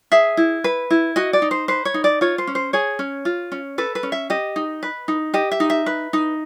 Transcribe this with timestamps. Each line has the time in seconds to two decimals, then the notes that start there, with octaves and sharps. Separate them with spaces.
0.12 G#4 E5
0.37 E4
0.64 B4
0.90 E4
1.16 F#4 D#5
1.33 D5
1.42 D#4
1.51 C5
1.68 B4 C5
1.85 C#5
1.94 D#4
2.04 D5
2.21 F4 C#5
2.38 C5
2.47 C#4
2.55 C5
2.73 G#4 C#5
2.99 C#4
3.25 F4
3.52 C#4
3.78 A4 B4
3.95 B4
4.03 C#4
4.12 E5
4.30 G4 D#5
4.56 D#4
4.83 B4
5.08 D#4
5.34 G4 D#5
5.51 E5
5.60 D#4
5.70 E5
5.86 B4
6.13 D#4